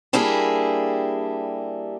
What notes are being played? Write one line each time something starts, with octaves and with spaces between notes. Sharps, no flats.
G3 A#3 D4 E4 G4 G#4